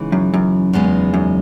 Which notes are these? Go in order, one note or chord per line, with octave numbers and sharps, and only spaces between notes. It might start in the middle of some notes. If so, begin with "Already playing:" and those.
Already playing: C#3 E3 G#3 D#4
F#2
F#2
E2 C#3 G#3 B3 D#4
F#2